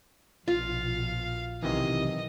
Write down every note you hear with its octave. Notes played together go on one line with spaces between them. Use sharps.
A#1 B2 F4 F5
B1 C3 D#3 E3 D#5